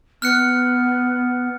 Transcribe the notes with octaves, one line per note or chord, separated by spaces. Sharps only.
B3 F6 F#6 C#7